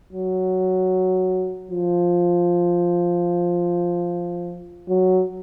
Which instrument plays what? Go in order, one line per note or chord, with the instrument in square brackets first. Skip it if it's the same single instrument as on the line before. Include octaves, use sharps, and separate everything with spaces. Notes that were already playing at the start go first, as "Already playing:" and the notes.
[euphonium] F#3
F3
F#3